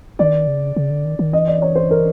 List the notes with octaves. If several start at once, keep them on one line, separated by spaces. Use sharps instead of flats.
D#3 D5
C#3
C#3
D3
D#3
D#3
E3 D#5
D5
C#5
C5
A#4